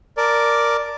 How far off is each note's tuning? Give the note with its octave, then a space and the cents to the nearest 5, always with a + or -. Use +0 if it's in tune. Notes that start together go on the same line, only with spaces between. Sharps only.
A#4 +0 D5 +0 A5 +0